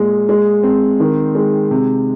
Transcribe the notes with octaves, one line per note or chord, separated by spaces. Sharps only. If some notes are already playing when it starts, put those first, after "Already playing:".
Already playing: A#2 G#3
G#3
C4
D#3
G#3
C3